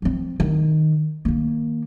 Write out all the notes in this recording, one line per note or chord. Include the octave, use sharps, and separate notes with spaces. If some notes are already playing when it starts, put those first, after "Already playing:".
F3 C4
D#3
D#3 A#3